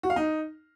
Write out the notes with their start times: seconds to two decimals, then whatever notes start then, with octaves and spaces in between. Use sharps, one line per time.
0.03 F#4
0.10 F5
0.16 D#4